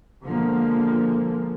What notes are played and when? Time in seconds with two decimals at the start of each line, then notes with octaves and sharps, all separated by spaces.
0.23 B2 D3 F3 G#3 A#3